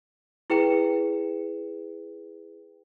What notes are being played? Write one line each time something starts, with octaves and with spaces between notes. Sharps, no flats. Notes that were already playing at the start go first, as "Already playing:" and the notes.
E4 G#4 B4 G5 C#7 E7